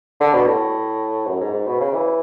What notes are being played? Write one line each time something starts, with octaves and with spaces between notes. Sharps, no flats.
D3
B2
A2
F#2
G#2
G#2
B2
C#3
E3